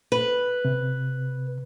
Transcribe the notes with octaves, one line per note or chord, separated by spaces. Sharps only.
B4
C3